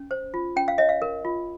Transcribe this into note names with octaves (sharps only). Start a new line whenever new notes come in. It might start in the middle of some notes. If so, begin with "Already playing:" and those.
Already playing: C#4
C5
F4
C#4 G5
F5
C#5 D#5
F5
A#4
F4